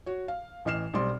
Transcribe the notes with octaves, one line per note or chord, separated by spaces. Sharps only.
F#4 C#5
F5
A1 E3 D#5 F6 C7 E7
B1 G3 C4 D5 C6